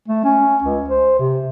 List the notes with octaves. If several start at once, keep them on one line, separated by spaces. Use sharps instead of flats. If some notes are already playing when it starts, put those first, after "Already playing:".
A3
C#4
C#2
C5
C3